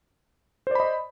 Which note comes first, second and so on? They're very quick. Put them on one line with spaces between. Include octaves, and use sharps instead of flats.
C5 D5 B5 D#5